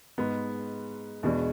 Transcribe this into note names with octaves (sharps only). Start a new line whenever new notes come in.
G#2 G#3 B3
E2 B2 G#3 D4